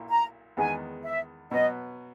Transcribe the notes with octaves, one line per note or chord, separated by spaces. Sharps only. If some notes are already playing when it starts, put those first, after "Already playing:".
Already playing: B1 A#2 A#3 E4
A#5
E2 D#3 G#3 B3 G#5
E5
B2 F#3 B3 D#5